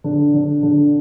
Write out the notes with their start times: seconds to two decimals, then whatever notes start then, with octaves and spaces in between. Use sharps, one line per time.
0.04 D3
0.34 D3
0.63 D3